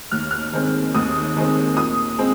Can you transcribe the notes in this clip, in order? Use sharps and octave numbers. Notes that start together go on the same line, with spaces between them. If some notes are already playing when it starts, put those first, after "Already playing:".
D#2 F6
F6
D#3 G#3 C4
D#2 D#6
D#3 G#3 C4
A#2 D#6
G#3 C4